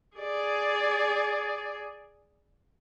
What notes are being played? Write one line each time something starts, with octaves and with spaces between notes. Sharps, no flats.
G#4 D5